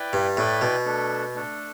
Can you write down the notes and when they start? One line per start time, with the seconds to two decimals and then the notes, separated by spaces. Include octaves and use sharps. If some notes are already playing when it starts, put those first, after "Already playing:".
Already playing: E4 B4 D5 G5
0.13 G2
0.37 A2 E4 B4 D5 G5
0.61 B2
0.85 A3 D4 A4
1.35 A3 D4 A4